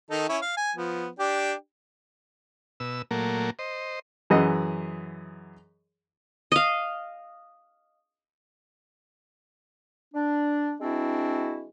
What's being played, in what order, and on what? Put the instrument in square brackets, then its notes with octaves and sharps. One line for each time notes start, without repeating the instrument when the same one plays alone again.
[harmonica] D#3 D#4 A4
C#4 E4 C#5
F5
G#5
F3 B3
D4 G4 G5
[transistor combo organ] B2 E6
A#2 F#3 A3 A#3
C5 D#5
[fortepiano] F#2 E3 G#4 D#5 F#5
[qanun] D#5 F5
[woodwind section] D4
E3 G#3 C4 D4 E4 F#4